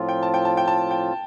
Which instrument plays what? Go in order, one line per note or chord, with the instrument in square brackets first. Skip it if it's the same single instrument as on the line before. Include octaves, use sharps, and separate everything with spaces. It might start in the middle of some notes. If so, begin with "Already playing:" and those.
Already playing: [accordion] A2 F3 C4 F4
[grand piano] G5
A5
G5
A5
G5
A5
G5